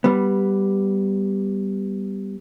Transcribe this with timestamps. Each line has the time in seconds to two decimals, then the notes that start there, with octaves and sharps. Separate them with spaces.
0.04 G3 B3